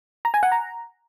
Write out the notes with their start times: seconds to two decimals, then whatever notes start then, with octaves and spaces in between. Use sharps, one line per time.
0.25 A#5
0.34 G#5
0.43 F#5
0.52 A#5